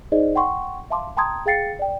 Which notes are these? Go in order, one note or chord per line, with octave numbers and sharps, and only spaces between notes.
D#4 G#4 C5 D5 D#5
F#5 G5 C6 C#6
E5 F5 A5 C6 D6
G5 A5 A#5 C6 D#6 G#6
G#4 F5 G5 A6 C7 C#7
D5 G5